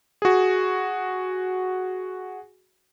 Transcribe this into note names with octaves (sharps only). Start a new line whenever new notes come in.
F#4 G#4